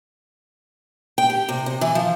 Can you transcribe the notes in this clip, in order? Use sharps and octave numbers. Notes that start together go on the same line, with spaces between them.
G5
G4
C3
C3
E3
F3